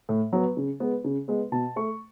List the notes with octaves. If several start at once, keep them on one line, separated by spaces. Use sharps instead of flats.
A2
F#3 B3
C#3
G#3 B3
C#3
G#3 B3
B2 A5
A3 C#6